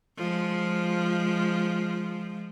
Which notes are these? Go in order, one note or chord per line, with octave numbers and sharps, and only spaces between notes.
F3 G#3